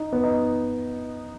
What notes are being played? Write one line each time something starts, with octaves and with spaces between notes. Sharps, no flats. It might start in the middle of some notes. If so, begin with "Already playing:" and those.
Already playing: D#4
B3
D#4